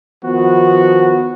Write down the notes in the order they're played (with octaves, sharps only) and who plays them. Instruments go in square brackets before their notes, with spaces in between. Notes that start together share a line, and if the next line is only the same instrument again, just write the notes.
[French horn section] D#3 F3 B3 [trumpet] F#4